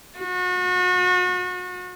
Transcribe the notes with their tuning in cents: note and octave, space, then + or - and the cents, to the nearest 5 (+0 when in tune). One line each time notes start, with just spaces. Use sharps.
F#4 -35